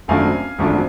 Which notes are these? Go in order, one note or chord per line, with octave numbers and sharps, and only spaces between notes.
G#1 F#2 F3 A3 D4 F5 G#5
G#1 F#2 F3 A3 D4